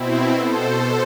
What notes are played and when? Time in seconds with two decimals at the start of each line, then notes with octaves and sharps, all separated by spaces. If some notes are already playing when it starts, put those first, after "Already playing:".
Already playing: B2 C4 E4
0.36 B2 A4 C5